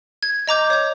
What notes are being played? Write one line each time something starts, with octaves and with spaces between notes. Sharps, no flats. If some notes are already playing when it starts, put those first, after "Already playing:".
G#6
D#5 A#5 D6 G6
C#5 G6